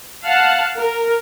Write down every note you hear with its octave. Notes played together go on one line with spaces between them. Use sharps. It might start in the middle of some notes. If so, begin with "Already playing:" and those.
F5 F#5 A5
A#4